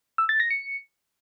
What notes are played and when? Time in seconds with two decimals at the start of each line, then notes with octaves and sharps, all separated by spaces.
0.18 E6
0.29 A6
0.40 A#6
0.51 C#7